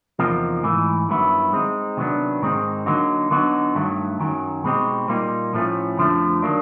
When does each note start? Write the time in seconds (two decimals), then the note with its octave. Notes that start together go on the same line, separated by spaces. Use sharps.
0.19 E2 C3 F3 A#3 D#4
0.63 G#2 E3 A3
1.09 G2 D#3 F#3 B3 E4
1.53 G#3 C4 D#4
1.97 C3 D#3 F#3 B3 D4
2.42 G#2 D#3 G#3 C4 D#4
2.86 D3 F#3 A#3 D#4 F#4
3.31 D3 F#3 B3 D#4 F#4
3.75 G2 D#3 F#3 A3
4.20 F#2 D#3 F#3
4.64 B2 G#3 C4 D#4 G4
5.08 A#2 G3 A#3 D#4
5.53 A2 F3 A3 C#4
5.97 F2 D3 F3 A3
6.42 D#3 F#3 A#3 D4